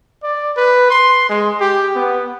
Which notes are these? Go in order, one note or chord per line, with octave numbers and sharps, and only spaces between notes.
D5
B4
C6
G#3
G4
B3